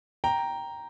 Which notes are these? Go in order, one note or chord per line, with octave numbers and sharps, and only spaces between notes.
G5 A#5